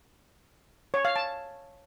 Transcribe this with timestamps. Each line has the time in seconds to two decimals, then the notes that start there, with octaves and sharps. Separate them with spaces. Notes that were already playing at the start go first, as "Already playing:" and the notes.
0.94 C#5
1.05 F5
1.16 A5